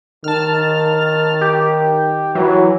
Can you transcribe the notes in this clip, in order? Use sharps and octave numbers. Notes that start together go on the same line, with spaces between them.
D#3 A5 F6
G4
E3 F#3